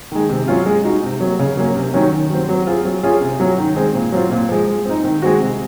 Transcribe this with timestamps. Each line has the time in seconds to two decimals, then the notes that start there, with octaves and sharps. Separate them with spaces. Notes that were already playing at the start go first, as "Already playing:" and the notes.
0.12 D#3 G#3
0.29 C3
0.48 F#3 C#4 F4
0.66 G#3
0.84 D#4 F#4
1.03 C3
1.20 F#3 A#3
1.39 C#3
1.57 F#3 A#3 C#4
1.76 C3
1.94 D#3 F#3 C#4
2.12 D#3
2.30 F#3 C4
2.49 F#3
2.67 C4 F4 G#4
2.85 F#3
3.03 C#4 F4 G#4
3.21 C3
3.40 F#3 C#4
3.58 D#3
3.76 G#3 C4
3.94 A#2
4.12 F#3 C4 F4
4.31 A#2
4.49 F3 G#3
4.68 G#3
4.85 C4 D#4
5.04 D#3
5.22 G#3 C4 F#4
5.40 C3